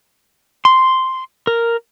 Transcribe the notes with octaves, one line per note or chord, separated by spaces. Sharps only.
C6
A#4